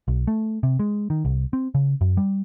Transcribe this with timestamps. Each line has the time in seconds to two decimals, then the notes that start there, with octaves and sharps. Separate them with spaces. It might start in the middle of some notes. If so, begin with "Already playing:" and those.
0.08 B1
0.27 A3
0.63 C3
0.79 G#3
1.10 D#3
1.25 C2
1.53 C4
1.75 C#3
2.01 F#2
2.17 G3